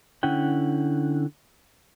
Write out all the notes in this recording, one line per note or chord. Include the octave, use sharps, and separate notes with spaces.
D3 C#4 E4 F#5 G5